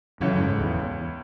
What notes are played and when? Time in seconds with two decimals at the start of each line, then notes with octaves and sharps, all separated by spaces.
0.20 C#2 F#2 C#3 E3 A3 C#4
0.40 G#2
0.60 E2